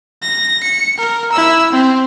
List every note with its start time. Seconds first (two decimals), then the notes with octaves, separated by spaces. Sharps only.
0.23 A#6
0.63 C#7
0.97 A#4
1.32 E4 E6
1.72 C4